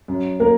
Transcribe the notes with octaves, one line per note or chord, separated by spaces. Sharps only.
F#2
A#3 A#4